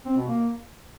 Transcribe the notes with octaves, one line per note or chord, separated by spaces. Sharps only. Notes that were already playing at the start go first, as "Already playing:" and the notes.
C4
B2
A#3